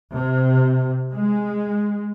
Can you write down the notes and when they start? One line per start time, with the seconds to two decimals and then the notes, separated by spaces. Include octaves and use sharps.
0.13 C3
1.12 G#3